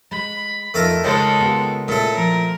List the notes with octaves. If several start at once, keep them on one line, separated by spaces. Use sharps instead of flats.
G#3 B5
F2 A3 D#4 F4 A4 A#4
C#2 D#3 G#3 A4 C#5
B3 F4 G4
A#2 G#3 A3 C#4 E4 A4
F3 A#4